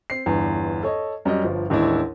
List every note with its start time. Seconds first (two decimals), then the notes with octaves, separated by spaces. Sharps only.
0.10 C4 C7
0.26 G1 E2 G2
0.83 A4 C#5 D#5
1.25 F#2 G3 D#5
1.44 G1 F3
1.70 A1 D#2 G#3 D4 E4